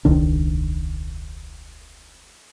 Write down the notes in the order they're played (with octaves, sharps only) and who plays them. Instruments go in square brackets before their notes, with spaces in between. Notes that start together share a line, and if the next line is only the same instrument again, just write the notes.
[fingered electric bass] E1 C#2 D#3 D4